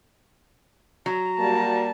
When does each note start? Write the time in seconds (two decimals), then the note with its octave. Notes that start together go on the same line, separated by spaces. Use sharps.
1.06 F#3 A#5
1.39 G3 A#3 F#4 A5